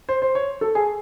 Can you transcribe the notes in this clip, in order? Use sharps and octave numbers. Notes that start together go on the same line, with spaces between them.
C5
C5
C#5
A4
G#4